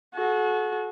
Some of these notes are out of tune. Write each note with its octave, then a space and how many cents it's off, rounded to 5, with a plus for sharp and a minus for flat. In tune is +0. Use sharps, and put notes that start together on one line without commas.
F#4 -15 A4 -40